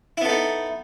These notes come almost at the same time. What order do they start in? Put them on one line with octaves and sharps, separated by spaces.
E4 B3 A4 D#4